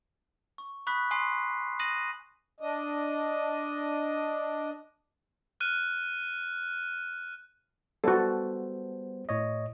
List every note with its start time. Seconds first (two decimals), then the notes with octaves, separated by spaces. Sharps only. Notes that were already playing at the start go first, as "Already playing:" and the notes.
0.58 C#6
0.87 B5 C#6 D#6 F#6 B6
1.11 G#5 C6 D#6 C7
1.79 D#6 F#6 A#6 D#7 F#7
2.60 D4 D#5
5.60 F6 F#6 D#7
8.04 G3 B3 F#4 A4 C5
9.29 A2 C#5 D#5